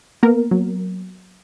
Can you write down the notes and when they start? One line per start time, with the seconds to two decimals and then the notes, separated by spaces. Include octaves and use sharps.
0.23 A#3 B3 A#4
0.51 F#3